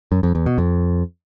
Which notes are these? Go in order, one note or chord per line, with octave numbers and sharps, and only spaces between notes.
F#2
F2
E2
B2
F2